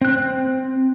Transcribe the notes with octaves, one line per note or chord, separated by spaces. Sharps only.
C4 F#6